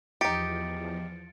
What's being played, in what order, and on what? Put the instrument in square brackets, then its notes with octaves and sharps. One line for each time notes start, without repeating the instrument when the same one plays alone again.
[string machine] E2 F3 [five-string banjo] D#4 G4 [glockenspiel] A6 C#7 D7